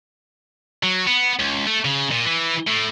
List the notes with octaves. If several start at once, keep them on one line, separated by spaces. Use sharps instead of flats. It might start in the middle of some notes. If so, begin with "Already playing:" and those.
F#3
B3
C#2
A3
C#3
A#2
E3
A2